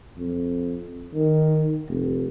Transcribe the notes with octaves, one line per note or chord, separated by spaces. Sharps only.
F2
D#3
F1